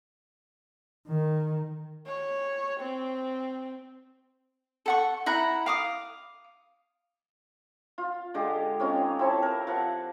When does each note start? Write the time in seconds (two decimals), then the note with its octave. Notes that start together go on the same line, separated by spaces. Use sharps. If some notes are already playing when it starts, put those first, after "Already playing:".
1.08 D#3
2.06 C#5
2.80 C4
4.86 A4 F#5 C#6
5.26 E4 F#5 A#5
5.66 F5 D6 D#6
7.98 F4
8.34 D3 G#3 G4
8.79 C4 C#4 D#4 F4
9.19 C4 E4 C#5 A5
9.42 A#4
9.67 F3 F#5 A5